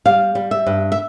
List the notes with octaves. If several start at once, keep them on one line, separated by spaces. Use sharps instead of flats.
G3 F5
G3
E5
G2
E5